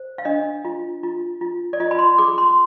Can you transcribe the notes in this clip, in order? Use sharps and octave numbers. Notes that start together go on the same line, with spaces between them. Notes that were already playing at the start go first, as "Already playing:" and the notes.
Already playing: C5
F5
D4 D#5
F4
F4
F4
D5
F4 D#5
B5
C6
G#4 D6
C6